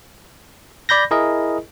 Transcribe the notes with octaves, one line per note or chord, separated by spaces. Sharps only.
D5 B5 G6 A#6
E4 G#4 A#4 D#5